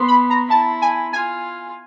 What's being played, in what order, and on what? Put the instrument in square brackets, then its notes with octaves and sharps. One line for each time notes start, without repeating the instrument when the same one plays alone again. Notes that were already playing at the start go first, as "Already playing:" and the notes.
Already playing: [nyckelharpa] B3 [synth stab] C6
[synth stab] B5
A#5
[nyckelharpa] E4 [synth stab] A5
[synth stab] G#5
[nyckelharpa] F4 [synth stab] G#5